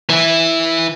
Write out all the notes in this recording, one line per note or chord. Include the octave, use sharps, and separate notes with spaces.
E3 E4